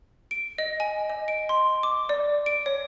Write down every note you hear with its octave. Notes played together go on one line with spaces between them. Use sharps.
D7
D#5
G#5
D#5
D7
C6
D6
D5
D7
C#5